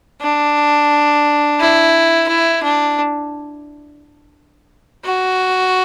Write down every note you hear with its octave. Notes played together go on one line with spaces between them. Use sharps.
D4
E4
E4
D4
F#4